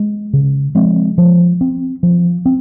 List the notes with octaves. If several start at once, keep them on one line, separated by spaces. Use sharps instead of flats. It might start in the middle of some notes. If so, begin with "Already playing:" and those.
Already playing: G#3
C#3
F3 G#3 C4
F3
C4
F3
C4